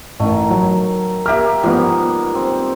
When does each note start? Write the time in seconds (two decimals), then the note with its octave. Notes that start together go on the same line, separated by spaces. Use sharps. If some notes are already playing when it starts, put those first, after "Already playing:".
0.19 A1 D#3 A3
0.50 F#3
1.26 A#3 G4 A#4 E5 F6
1.63 G#2 F3 G3 B3
2.35 C4